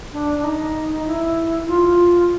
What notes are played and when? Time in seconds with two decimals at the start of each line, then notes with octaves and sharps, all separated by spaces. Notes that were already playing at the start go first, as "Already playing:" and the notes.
0.13 D4
0.39 D4
0.44 D#4
1.07 E4
1.63 E4
1.68 F4